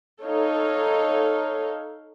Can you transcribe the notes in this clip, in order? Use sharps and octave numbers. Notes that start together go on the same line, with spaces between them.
D#4 A4 C#5 F5